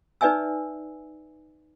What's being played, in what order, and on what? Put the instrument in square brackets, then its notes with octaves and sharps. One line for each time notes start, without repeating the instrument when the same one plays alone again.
[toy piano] D#4 B4 D5 E5 G#5 E6